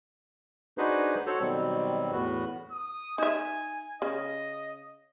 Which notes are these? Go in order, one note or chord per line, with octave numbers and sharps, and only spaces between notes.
D4 D#4 F#4 G#4 B4 C5
F#4 A4 C5 C#5
B2 D#3 F#3 G3 C4
E2 A2 B3 F#4
D#6
D#4 E5 G#5
C#3 D#5